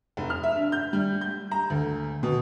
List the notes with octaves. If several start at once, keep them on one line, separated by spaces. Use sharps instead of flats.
F1
F6
E5
D4
G6
G3
G6
A#5
D2
B2